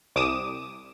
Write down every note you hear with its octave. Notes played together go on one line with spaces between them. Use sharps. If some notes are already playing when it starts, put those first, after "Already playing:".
C2 D6 D#6 E7